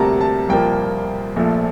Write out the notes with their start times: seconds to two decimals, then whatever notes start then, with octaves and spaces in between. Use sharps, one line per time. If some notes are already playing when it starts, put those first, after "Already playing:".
Already playing: D2 C3 G3 A#3 A5 A#5
0.21 A5
0.49 C2 A#2 F3 A#3 G5
1.36 A#1 A#2 F3 A3